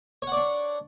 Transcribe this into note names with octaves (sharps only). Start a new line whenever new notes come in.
D4 C#5 D5 F#5